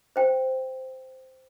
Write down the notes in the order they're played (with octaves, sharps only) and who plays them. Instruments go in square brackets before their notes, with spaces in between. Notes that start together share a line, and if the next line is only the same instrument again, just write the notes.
[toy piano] C5 G5